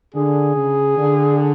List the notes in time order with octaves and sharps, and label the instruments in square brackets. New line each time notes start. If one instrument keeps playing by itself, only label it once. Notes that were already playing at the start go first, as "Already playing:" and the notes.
[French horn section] D3 [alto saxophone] G#4
[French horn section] C#3
D3